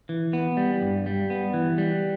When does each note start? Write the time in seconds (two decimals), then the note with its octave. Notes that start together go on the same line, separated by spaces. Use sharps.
0.09 E3
0.33 B3
0.57 G3
0.82 G2
1.06 G3
1.30 B3
1.54 E3
1.78 G3